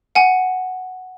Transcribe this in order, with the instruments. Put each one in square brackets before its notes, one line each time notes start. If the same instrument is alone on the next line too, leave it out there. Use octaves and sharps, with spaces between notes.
[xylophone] F#5 G#5